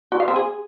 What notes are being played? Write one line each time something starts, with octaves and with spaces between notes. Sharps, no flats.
F#4
F5
C4
G#4